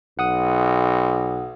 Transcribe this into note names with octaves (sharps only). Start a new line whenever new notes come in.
B1 F#5 D#6